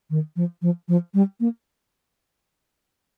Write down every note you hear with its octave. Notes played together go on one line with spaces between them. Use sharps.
D#3
F3
F3
F3
G3
A#3